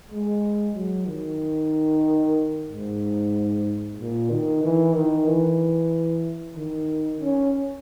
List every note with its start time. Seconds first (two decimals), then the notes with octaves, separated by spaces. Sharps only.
0.11 G#3
0.75 F#3
1.08 D#3
2.70 G#2
3.98 A#2
4.30 D#3
4.63 E3
4.95 D#3
5.27 E3
6.57 D#3
7.21 C#4